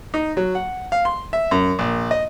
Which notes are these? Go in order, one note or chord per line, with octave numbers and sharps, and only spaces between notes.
D#4
F#3
F#5
F5
C6
E5
F#2
A#1
D#5